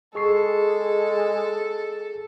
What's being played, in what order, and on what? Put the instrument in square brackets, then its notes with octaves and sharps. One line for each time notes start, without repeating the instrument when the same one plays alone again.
[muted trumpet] G#3 [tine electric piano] G#4 C#6 C7 [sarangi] A4